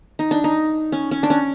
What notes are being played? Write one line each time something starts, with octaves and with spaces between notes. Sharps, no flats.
D#4
D4
D#4
C#4
C#4
D4
C#4